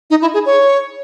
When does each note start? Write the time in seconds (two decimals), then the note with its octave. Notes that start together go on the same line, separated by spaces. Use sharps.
0.10 D#4
0.22 E4
0.34 G#4
0.46 C#5